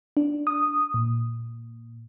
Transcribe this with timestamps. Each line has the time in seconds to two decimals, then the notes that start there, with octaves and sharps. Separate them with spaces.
0.17 D4
0.47 D#6
0.94 A#2